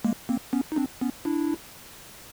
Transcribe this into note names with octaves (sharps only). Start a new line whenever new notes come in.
G#3 A#3
A#3 C4
B3 C#4
D#4
C4 D4
B3 C#4
D4 E4